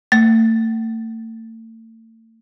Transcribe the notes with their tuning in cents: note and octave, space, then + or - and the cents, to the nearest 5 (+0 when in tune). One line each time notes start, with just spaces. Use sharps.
A3 +40